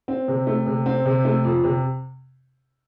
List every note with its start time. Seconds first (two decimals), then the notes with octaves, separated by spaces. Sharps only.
0.08 C4
0.28 C3
0.47 A3
0.66 C3
0.86 C4
1.05 C3
1.25 A3
1.45 F2
1.64 C3